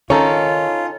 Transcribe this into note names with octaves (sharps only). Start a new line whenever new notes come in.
D#3 C#4 D#4 F4 A4 C#5